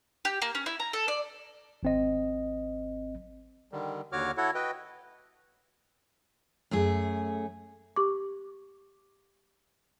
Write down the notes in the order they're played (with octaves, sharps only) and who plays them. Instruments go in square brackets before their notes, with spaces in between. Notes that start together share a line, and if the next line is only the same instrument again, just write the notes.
[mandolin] G4
A#3
C#4
E4
A#5
A4
D5
[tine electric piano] G#1 C4 D#5
[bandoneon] D3 D#3 G3
D#2 D3 F#4 C#5 D6 F6
E4 F#4 A4 C#5 F#5
F#4 B4 D#5 G5
[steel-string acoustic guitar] F#2 A3 G#4
[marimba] G4 C#6 D6